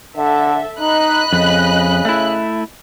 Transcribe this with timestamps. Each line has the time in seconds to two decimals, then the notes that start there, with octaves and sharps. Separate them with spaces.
0.17 D3 A4 E5
0.80 D#4 D#5 B5 F#6
1.33 F2 C#3
2.05 A3 E4